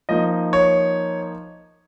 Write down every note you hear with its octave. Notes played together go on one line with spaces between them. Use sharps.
F3 A#3 D#4 D#5
C#5